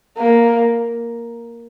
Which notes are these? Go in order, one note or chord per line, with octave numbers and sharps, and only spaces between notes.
A#3